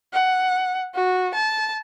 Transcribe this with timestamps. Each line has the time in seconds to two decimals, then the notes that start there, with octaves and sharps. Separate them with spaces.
0.13 F#5
0.95 F#4
1.35 A5